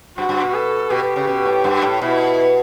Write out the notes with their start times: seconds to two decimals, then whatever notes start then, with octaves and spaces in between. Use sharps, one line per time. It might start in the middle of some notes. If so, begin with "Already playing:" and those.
0.18 G2 F#4
0.29 G2
0.42 B2
0.54 A4
0.90 B2 G4
1.03 B2
1.16 C#3
1.27 B2
1.45 A2
1.64 G2
1.82 A2
2.01 B2 E4